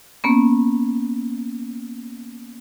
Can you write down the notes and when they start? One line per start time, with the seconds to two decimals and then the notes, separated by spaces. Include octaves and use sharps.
0.24 A#3 B3 C#4